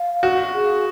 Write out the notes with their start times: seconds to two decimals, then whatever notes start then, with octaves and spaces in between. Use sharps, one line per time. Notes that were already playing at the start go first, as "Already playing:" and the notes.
Already playing: F5
0.23 F#4
0.53 G#4